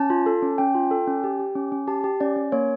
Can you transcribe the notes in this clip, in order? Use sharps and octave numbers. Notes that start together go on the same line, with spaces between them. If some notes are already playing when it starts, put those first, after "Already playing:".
Already playing: C#4 A5
F4
A4
C#4
C#4 G5
F4
A4
C#4
G4
G4
C#4
C#4
G4 A5
G4
C#4 D5
C#4
A#3 C#5